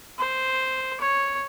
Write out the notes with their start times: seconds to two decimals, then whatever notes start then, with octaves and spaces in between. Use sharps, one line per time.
0.18 C5
1.00 C#5